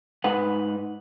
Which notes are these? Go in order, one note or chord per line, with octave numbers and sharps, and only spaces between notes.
G#2 D#4 B4 F#5